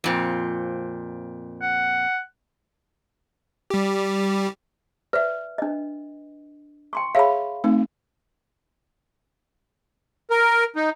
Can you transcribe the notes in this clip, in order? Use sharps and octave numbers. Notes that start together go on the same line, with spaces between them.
F2 A#2 C4
F#5
G3 G4
B4 D5 E5
D4 D#5
G5 C6 C#6
G#4 C#5 E5 F5 B5
A3 C4 D#4
A#4
D#4